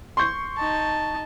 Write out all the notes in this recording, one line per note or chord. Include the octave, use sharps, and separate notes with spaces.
C6 C#6 G6
D#4 A5